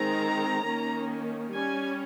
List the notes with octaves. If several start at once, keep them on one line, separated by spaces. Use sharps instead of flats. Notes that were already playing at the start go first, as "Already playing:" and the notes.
Already playing: D#3 G#3 C4 A#5
D#3 A#3 C#4
G3 C#4 G#5